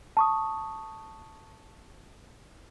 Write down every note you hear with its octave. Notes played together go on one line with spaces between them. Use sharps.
A5 C#6 D#6